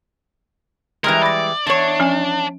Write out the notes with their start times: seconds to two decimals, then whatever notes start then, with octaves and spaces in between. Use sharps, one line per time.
1.04 E3 G3 G#3 A#4 F6 G#6
1.22 D5 B5 A#6
1.67 E2 D4 C#5
2.00 F3 C#4 G#5